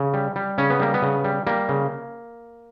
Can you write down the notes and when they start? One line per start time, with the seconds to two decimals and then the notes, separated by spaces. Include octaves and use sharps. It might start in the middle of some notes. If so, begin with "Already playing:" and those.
Already playing: C#3
0.14 G3
0.36 G3
0.58 C#3 C#4
0.70 B3
0.80 G3 A#3
0.94 B3
1.02 C#3
1.24 G3
1.47 G3 A#3
1.69 C#3